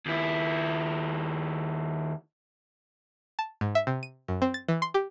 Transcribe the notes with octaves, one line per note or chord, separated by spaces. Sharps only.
D#2 E4
A5
G#2
E5
C3
D#7
F#2
C4
A6
E3
C6
G4